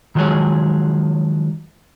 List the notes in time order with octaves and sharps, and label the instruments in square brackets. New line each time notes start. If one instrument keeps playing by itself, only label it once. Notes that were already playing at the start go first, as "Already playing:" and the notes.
[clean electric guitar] D#3 F3 F#3 G#3 G#4 C#5